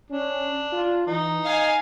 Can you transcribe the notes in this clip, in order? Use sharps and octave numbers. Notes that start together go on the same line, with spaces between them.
C#4 D4
F4
E3 D#4
D#5 F5 G#5